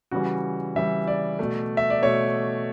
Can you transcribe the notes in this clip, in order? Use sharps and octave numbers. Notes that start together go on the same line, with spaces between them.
C#3 E3 G3 F#4
C#3 E3 G3 E5
D5
B2 A3
E5
D5
B2 A3 C#5